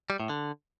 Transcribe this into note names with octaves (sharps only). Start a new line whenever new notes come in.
G3
A2
D3